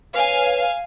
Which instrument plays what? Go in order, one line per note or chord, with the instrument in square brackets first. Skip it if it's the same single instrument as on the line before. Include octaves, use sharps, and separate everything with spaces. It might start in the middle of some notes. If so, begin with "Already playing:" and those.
[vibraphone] B4 C#5 [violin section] F5 G#5